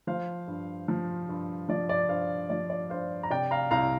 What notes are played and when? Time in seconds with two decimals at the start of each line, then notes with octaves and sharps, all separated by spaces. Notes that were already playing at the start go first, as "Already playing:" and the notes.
0.07 F3 C5 F5
0.48 G2
0.88 F3
1.29 G2
1.69 F3 D5
1.89 D5
2.09 G2 C5 F5
2.50 F3 D5
2.70 D5
2.90 G2 C5 F5
3.23 A#5
3.30 C3 D5 G5
3.51 F5 A#5
3.71 C2 F5 A#5